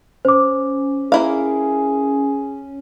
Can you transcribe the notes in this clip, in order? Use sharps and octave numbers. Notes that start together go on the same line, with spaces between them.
C#4 C5 D6
A#3 E4 G#4 F5